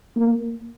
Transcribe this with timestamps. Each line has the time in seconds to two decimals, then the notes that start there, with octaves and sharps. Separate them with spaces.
0.17 A#3